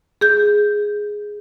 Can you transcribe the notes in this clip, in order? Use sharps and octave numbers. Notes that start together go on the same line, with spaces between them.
G#4 G6